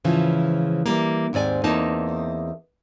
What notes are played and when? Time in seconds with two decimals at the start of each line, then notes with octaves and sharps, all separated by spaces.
0.04 G#2 C#3 E3 F3
0.86 E3 G3 A#3
1.33 D#2 G#2 C4 D5 G#5
1.64 E2 A#3 C4 D#4 A5